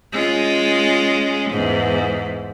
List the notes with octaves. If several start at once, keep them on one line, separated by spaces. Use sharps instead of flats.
G#3 C#4 F4
E2 G#2